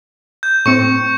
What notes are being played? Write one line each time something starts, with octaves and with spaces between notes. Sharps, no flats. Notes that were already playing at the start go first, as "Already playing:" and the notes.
G6
A2 C4 C#6 C#7